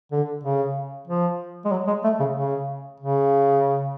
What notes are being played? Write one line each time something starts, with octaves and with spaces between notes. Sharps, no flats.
D3
C#3
F3
G#3
F#3
G#3
A3
C#3
C#3
C#3